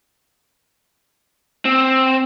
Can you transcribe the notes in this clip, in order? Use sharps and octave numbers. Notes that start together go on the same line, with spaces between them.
C4